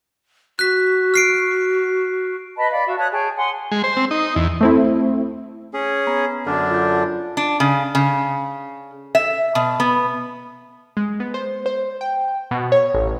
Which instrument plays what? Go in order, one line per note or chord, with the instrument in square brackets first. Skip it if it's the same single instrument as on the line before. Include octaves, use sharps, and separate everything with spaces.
[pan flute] F#4 [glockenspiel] F#6 B6
[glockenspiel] F6 C7 D7
[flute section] B4 D#5 A5 B5
D5 F5 B5
F#4 E5 F5
C#5 A5 D#6 F#6
G#4 C#5 G5 A5
F#5 G#5 C6 D#6
[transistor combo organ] G#3
C5
C4
D#4
E2
[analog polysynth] A3 C4 E4
[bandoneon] C#4 G#4
[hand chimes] B3 A#5 B5
[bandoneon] F#2 D3 D4 [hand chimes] A4 D5 F6
[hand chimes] F4 G6
[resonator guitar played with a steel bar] D4
C#3
C#3
E5
B2
B3
[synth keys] G#3
B3
C5
C5
G5
B2
C#5
A1